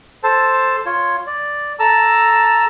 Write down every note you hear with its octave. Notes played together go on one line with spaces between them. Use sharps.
A4 C5 A5
F4 C#5
D5
A4 A5 A#5 E6